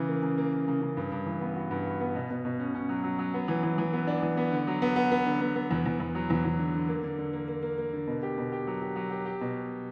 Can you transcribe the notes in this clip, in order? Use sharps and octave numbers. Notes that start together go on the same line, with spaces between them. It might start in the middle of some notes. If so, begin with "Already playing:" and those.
Already playing: C#3 E3
A#3
C#3
A#3
A#3
C#3
C#3
G2
G2
E3
B3
F#4
G2
F#4
B3
B2
B2
B2
C#4
C#4
F#3
F#3
F#3
B3
E3
E3
E3
B3
D4
E3
B3
D3
F#3
B3
B3
B3
D3
B3
B3
E2
E2
E2
F#3
E2
E2
D3
D3
A#3
D3
D3
A#3
A#3
A#3
A#3
D3
B2
G4
B2
G4
F#3
G4
F#3
G4
G4
B2